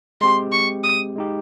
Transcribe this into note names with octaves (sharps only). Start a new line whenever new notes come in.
G#3 C4 G4 C6
C#6
D#6
G#3 D#4 G4